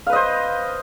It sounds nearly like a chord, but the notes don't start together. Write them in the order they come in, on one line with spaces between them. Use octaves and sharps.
F5 B4 D#5 C5